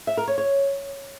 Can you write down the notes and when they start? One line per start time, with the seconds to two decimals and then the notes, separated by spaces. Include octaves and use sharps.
0.07 E5
0.17 A#4
0.28 C#5
0.38 C#5